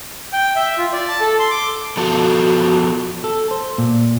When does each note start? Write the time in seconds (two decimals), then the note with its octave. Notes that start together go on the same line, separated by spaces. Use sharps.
0.33 G5
0.56 E5
0.78 F4
0.93 D5
1.08 A5
1.21 A4
1.39 C6
1.51 D6
1.97 F3 B3 F#4 A4
3.24 A4
3.51 C5
3.78 A#2